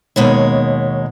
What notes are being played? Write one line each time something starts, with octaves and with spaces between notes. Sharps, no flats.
D#2 B2 G#3 C#5